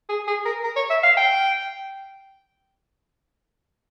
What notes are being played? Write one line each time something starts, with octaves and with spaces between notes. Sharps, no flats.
G#4
G#4
A#4
A#4
C#5
E5
F5
G5